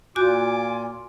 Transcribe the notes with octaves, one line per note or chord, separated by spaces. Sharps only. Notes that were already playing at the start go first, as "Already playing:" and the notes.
A#2 F4 F#4 G#5 D6 F#6 G6